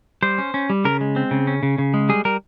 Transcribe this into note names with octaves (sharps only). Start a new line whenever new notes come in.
G3 C5
C#4
C#4
G3
C#3 A#4
G#3
C4
C#3
C#4
C#3
C#3
G#3
G3 G#4
G3 A#4